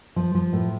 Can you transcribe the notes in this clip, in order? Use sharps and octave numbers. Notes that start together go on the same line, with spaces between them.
F3
F3
A2